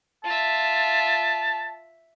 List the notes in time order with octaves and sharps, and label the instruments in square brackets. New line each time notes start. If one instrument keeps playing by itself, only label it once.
[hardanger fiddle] F4 E5 [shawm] A5